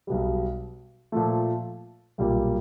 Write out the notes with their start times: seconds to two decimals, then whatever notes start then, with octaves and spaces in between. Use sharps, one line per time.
0.07 B1 B2 G3
1.12 A#2 F3 A3
2.18 B1 A#2 G3 A#3